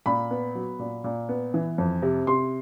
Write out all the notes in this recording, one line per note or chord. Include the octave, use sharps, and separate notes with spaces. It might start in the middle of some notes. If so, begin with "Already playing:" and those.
A#2 B5
B3
F#3
A#2
A#2
B3
E3
F2
C3
C3 C6